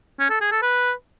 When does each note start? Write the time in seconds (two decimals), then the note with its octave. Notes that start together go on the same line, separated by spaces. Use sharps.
0.19 C#4
0.30 A4
0.41 G#4
0.51 A4
0.62 B4